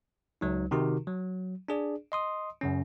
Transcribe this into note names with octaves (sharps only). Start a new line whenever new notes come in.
C#2 F#3 D#4
C3 D#3 D#4 F#4 G4 A#4
F#3
D4 G#4 D5
D#5 C6 D#6
F#2 C#3 C#4